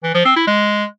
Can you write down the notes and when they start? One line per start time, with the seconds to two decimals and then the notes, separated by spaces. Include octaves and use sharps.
0.03 E3
0.14 F3
0.25 C4
0.36 E4
0.47 G#3